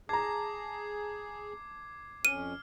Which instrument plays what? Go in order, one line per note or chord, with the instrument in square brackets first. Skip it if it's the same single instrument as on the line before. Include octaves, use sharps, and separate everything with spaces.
[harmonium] G#4 [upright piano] A5 A#5 [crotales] D6 G#6 C7
[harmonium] F2 C#4 [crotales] F6 [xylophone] D#7